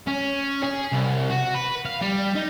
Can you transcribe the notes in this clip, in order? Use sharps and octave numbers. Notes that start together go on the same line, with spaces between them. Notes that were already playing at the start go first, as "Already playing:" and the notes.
C#4
G#4
C2
F#4
B4
F5
G3
D#4